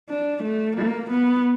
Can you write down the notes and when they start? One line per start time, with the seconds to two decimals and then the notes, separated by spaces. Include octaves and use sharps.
0.10 D4
0.43 A3
0.76 A#3
1.11 B3